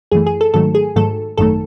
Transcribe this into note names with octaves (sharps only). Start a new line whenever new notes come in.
F#2 E3 A3 G#4
G#4
A4
G#2 D#3 F#3 A3 A4
G#4
G#2 D#3 F#3 A3 A4
G#1 F#2 D#3 A3 A4